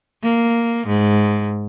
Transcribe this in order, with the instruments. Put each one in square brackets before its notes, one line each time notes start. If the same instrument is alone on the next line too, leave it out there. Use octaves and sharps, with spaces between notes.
[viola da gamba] A#3
G#2